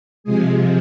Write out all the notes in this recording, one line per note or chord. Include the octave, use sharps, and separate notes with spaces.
C3 F3 G#3 G#4